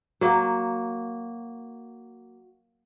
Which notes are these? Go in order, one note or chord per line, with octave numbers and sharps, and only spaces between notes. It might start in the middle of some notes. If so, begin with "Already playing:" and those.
F#3 A#3